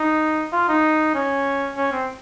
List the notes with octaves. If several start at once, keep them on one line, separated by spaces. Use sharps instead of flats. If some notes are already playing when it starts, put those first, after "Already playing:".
Already playing: D#4
F4
D#4
C#4
C#4
C4